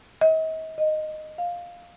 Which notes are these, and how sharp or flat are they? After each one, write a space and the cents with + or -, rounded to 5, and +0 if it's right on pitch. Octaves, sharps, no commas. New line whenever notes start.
D#5 +40
D#5 -10
F5 +5